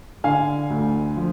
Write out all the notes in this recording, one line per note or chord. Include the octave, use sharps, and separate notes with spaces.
D3 F5 G#5
D2
F3